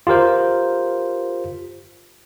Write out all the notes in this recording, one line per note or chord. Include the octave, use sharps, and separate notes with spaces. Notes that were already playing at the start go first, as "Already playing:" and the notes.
F4 G4 A#4 C5